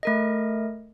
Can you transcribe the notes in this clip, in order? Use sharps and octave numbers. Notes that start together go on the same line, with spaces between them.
A3 A#4 D#5